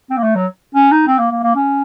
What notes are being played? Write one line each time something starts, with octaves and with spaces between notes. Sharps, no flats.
C4
A#3
A3
F#3
C#4
D#4
C4
A#3
A#3
A#3
C#4